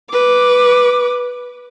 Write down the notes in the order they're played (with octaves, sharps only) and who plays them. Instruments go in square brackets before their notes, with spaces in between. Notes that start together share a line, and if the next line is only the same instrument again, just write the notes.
[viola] B4 D6